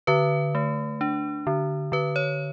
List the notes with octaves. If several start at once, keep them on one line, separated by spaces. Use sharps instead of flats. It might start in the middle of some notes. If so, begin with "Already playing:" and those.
D3 B4
A3
D4
D3
D3 B4
C#5